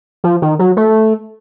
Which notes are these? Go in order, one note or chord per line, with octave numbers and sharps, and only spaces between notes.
F3
D#3
F#3
A3